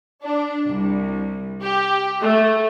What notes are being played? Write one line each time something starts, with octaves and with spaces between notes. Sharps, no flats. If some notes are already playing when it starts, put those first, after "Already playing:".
D4
C2
G4
A3